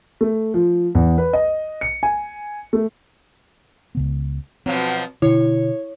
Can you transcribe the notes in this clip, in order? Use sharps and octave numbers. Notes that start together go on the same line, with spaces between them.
A3
F3
E2
B4
D#5
C#7
G#5
A3
C#2 C#3 B3
B2 F3 F#3 C4
B2 D3 E4 C#5